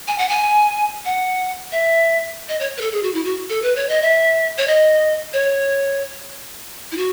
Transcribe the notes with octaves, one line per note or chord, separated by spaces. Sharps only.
G#5
F#5
G#5
F#5
E5
D#5
C#5
B4
A4
G#4
F#4
E4
F#4
A4
B4
C#5
D#5
E5
C#5
D#5
C#5
E4
F#4